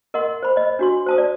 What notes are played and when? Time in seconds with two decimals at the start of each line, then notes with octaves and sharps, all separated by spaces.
0.14 A#4 D#5 F#5 C6
0.43 C5 B5
0.56 C#5 D#5
0.79 D4 F#4 C6
1.06 C5 A5 D#6
1.18 D5